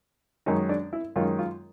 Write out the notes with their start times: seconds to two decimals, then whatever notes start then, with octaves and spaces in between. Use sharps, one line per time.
0.46 F#2 D#3 G#3 C#4 D#4
0.69 D4
0.93 E4
1.16 F#2 D#3 G#3 C#4 F4
1.39 F4